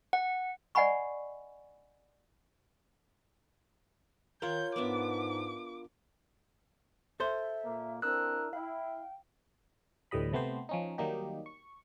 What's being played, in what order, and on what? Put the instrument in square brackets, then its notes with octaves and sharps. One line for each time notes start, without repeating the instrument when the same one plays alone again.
[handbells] F#5
[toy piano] D5 D#5 F#5 G#5 B5 C#6
[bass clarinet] D#3 [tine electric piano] F4 A#4 [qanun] C#5 F#5 G5 [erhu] G6
[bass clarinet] G#2 [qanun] B3 D4 E5 [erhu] D6
[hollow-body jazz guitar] A4 C5 [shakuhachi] E5
[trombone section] A#2 A#3
[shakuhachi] C4 [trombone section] D4 E4 A#4 [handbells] E6 F#6
[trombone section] E4 [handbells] F5 [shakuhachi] G5
[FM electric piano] D2 A2 E3 G3 D#5 B5
C3 A3 B3 G4 C5
F3 C#4 D#4
D#3 F#3 G3 A#3 D#4 G4
C#6